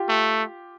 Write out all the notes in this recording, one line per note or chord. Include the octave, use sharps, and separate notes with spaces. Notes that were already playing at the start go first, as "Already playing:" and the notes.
Already playing: F4 G4
A3